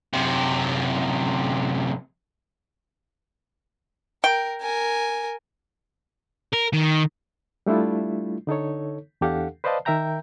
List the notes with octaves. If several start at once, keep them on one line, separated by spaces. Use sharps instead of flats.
F#2 C3
A#4 G5
A#4 G#5
A#4
D#3
G3 A3 D4 E4 F4
D3 D#4 A4 C#5
E2 D4 G4 A4 F5 F#5
B4 C5 D5 D#5 F5 A5
D#3 A#4 E5 G5 A#5 G6